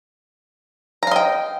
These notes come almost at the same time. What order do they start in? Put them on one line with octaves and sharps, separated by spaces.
A#5 F5 D#5 G5